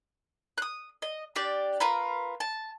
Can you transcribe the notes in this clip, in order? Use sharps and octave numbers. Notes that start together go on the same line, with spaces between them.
D#6 F#6
D#5
D4 G4 D5
F4 A#4 B4
A5